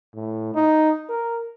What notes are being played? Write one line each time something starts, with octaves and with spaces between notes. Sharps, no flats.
A2
D#4
A#4